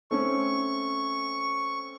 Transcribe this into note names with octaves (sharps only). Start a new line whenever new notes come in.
A3 C4 C#4 C#6